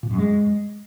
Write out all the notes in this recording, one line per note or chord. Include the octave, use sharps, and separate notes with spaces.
A#2
F#2
G#3